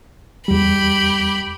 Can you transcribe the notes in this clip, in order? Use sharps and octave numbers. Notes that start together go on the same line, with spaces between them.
E2 G3 G4 B5